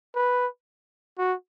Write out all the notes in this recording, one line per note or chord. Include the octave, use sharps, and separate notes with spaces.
B4
F#4